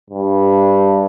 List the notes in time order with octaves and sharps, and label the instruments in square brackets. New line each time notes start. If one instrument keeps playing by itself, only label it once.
[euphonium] G2